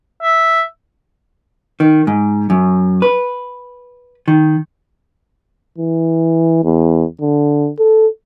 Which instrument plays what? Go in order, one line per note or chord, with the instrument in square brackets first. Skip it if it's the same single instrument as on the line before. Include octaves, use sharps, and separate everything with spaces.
[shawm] E5
[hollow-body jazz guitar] D#3
G#2
F#2
B4
D#3
[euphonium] E3
E2
D3
A4